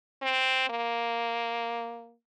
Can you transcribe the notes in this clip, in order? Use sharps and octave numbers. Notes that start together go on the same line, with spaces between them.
C4
A#3